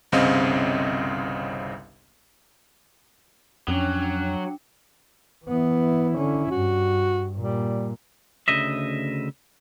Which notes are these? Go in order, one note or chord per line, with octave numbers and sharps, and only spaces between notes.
G1 C2 C#3 C4 D#5 F5
F2 F#3 C#4 D4 G5
E3 B3 E4
D3 C#4
G2 F#4
A#2 G3
D2 C#3 D#5 E5